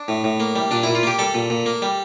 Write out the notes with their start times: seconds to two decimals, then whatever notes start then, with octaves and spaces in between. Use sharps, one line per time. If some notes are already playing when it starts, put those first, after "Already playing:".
Already playing: D4
0.08 A2
0.24 A2
0.40 A#3
0.56 G3
0.71 A#2 D4
0.83 A#2 E4
0.95 F4
1.03 A#3 G4
1.19 G3 A4
1.34 A#2
1.50 A#2
1.66 A#3
1.82 G3